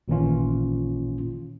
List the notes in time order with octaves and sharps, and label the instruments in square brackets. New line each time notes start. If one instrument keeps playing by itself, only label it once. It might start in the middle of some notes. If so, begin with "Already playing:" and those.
[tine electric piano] A1 A#2 D#3 E3 C#4 F4